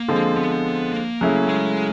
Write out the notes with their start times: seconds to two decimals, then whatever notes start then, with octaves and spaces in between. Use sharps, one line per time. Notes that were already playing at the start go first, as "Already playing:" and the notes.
Already playing: A#3
0.08 D3 F3 G#3 C4
0.37 B3
0.93 A#3
1.21 C#3 F#3 A3 C#4 E4
1.49 G#3